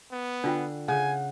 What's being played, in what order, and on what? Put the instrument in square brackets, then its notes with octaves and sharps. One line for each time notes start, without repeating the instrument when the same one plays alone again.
[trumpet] B3
[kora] D3 [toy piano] D4 F4 G5
[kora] C#3 [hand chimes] F#5 [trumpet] G#5